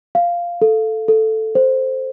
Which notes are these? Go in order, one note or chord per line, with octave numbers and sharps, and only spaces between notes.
F5
A4
A4
C5